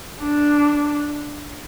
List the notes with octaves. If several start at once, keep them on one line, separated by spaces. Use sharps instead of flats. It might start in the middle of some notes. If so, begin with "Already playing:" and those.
D4